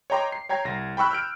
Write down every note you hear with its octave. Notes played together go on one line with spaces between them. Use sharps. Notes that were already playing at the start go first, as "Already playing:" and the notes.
C#5 D#5 G5 A#5 C6 D6
C7
C#5 G5 A#5 G#6 C7
C2 A#6
G5 B5 C#6 E6 F#6
E6 F6 G6 D7